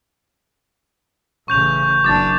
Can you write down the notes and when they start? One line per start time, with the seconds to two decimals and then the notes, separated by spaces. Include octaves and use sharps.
1.48 A1 C#3 C#6 G6 F7
2.04 F#1 D4 D6 A6